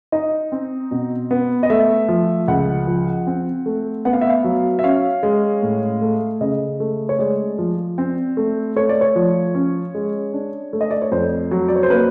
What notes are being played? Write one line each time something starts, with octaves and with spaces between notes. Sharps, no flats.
D#4 D#5
C4
B2
B3
D#5
A3 E5
F3
C#2 F#5
F3
C4
A3
B3 F#5
F5
E5
F5
F#3
E5
C#4 F5
G#3
A2
A3
C#3 D#5
A3
C#5
G#3 D5
F3
C4
A3
A3 C#5
D5
C#5
F3
C#4
G#3
D4
A3
D#5
D5
C#5
F2 C5
F#3
D5
C#5
C5
A#3 B4